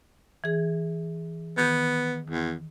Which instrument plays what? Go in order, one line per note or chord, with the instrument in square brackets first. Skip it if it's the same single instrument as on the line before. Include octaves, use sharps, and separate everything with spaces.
[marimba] E3 G#4
[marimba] D#3 G6 [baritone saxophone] B3
[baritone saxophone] E2